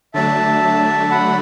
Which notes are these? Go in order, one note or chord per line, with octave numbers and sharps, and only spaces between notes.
D3 F#3 A3 D4 E5 A5
F#5 B5